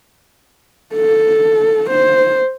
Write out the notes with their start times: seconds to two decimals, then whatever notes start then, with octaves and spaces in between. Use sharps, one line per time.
0.95 A4
1.90 C5